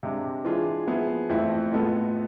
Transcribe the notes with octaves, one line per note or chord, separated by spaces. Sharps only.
C3 G#3 D4
E3 G#3 D4 F4 G#4
F3 B3 E4 G#4
F2 E3 A3 C4 E4
A2 G#3 B3 F4 A4